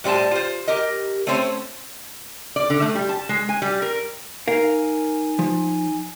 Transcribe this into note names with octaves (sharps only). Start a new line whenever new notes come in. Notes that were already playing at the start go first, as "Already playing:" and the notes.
A2 G3 C5 G#5 A5
F4 C5
G4 A#4 D#5
A3 C4 C#4 C5 C#5
D5
D3
A3
G3
A5
G#3
G#5
G3
A#4
D#4 A#4 F5 G#5
F3